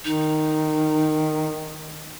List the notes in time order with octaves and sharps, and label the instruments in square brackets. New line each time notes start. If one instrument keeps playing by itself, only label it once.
[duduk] D#3 [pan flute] D#4